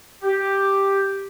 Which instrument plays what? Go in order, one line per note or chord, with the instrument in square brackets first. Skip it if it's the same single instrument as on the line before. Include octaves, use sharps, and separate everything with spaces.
[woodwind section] G4